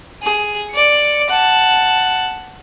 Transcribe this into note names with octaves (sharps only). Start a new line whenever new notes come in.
G#4
D5 C#7
F#5 A5